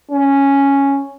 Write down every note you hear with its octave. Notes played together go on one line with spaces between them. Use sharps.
C#4